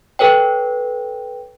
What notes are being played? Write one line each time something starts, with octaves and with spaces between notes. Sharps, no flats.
A4 B4 C#5 G5